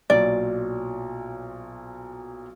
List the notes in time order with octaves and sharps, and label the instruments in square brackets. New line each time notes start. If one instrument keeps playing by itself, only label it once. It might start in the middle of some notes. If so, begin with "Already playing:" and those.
[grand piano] B1 A#2 F#3 [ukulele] D5